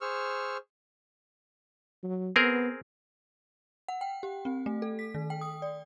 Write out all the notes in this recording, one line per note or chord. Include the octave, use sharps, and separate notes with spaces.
G#4 C5 C#6 E6 F6
F#3
B3 C4 G#4 A#4
F#5
G5
G4
C4
A3
A4
B6
D#3
G5
D#6
D5